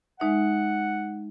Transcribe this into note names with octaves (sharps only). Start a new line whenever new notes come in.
G#3 D#4 E5 F#5